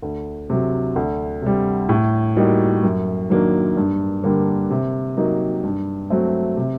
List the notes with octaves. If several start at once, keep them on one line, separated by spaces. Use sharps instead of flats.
D2
C3 F#3
D2
C3 G3
A2
G3 A#3 D#4 F#4
F#2
D#3 F#3 A#3 D4
G2
D3 G3 A#3
C3
F#3 A#3 D#4
G2
F#3 A3 C4
C3